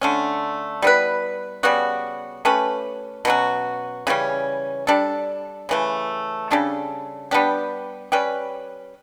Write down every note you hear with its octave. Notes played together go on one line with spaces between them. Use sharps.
D3 A3 C#4
G3 B3 E4 B4
C#3 G3 B3 F#4
A3 C#4 G4 B4
B2 F#3 C#4 F#4
C#3 E3 G3 C#4
G3 D4 A4
C#3 E3 A3
C#3 G3 D4 A4
G3 B3 D4 G4
G3 C#4 G4 B4